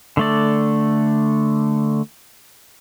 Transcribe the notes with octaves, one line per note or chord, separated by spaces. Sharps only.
D3 A3 D5